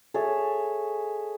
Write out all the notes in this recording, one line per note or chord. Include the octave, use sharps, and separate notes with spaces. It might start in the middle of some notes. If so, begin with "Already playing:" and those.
G#4 A4 C#5 E5